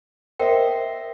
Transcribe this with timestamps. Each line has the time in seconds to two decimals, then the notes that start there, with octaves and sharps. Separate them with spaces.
0.39 A#4 C5 D#5 E5 G5